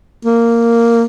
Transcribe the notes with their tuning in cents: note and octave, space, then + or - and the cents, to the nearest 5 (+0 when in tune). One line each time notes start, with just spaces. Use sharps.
A#3 -5